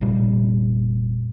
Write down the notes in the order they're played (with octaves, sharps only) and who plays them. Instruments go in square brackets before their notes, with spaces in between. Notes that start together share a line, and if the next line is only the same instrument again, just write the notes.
[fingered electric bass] F1 A#2 G3